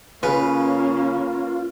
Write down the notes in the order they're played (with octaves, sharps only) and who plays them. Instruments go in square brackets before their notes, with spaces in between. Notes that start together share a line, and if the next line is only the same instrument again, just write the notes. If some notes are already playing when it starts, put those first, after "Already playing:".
[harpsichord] C#3 [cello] A#3 C#4 [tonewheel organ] F4 [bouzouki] B4